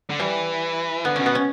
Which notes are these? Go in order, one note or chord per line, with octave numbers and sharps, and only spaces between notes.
D3
E3 G3
D3 B3
B2 C#4
B3
C#4